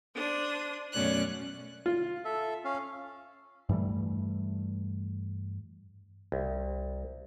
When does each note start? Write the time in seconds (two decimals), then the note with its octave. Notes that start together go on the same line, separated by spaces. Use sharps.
0.15 D4 C5 D#6
0.92 F#2 B2 A3 C#4 D5 F#6
1.86 F4
2.25 A4 E5
2.65 C#4 F5
3.69 G2 E3 G3 A3
6.32 C2